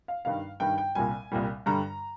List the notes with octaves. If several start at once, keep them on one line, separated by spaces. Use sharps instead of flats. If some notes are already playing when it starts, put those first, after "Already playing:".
F5
G2 D#3 G3 F5
G2 D#3 G3 G5
G5
C2 A#2 G3 G#5
C2 A#2 G3
G2 D3 G3 A#5